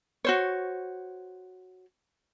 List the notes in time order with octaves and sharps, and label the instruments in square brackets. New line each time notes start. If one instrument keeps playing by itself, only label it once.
[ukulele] F#4 C5 C#5